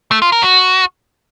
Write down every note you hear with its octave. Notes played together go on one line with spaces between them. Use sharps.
A3
F4
A#4
F#4